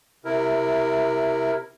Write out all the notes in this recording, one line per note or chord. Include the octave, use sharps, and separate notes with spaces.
C3 E4 A#4